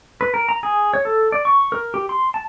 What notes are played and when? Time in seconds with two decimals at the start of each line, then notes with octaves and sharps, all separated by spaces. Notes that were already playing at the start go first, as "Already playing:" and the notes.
0.21 B4
0.34 A#4
0.49 A#5
0.63 G#4
0.93 C#5
1.05 A4
1.32 D5
1.45 C#6
1.72 A#4
1.94 G4
2.09 C6
2.34 A5